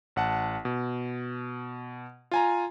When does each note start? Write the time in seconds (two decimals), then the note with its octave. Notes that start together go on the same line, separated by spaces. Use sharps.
0.16 A1 F#5 A5
0.65 B2
2.31 F4 G#5 A#5